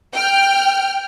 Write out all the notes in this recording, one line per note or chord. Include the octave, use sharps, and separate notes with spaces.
G5 F6